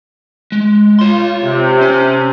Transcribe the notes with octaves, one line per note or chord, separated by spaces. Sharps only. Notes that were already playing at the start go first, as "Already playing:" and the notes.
G#3
F4 C#5 C6
C3
C#4